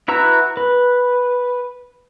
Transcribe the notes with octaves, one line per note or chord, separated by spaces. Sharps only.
E4 F#4 B4 A#5 E6
B4